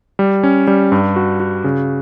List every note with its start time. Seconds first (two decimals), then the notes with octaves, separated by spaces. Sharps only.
0.19 G3
0.43 C#4
0.67 G3
0.92 G2
1.16 F#4
1.40 F#4
1.64 C#3